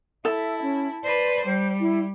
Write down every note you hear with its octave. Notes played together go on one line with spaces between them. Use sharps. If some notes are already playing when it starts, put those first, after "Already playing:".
E4 A4 E5
C#4
B4 C5 D5
G3 C5
E4